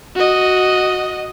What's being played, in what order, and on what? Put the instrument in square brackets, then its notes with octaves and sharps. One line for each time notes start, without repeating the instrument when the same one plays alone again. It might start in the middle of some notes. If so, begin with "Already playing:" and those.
[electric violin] F#4 D#5